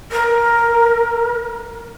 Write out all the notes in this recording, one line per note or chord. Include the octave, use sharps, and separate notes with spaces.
A#4